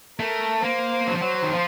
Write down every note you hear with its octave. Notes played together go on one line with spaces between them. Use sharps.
A3 A#4
A#3 C5
F#3
F3
F#3
D#3
F3